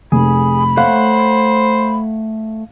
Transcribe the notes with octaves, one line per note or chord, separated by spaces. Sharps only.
F1 G#4 B5
A3 C5 C#5 F5 F#5